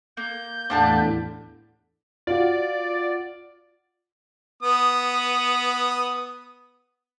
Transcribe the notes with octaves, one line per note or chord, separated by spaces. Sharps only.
A#3 G6
E2 A2 D3 A#3 D4 G4 D5 A5
F4 F#4 D5
B3 D#6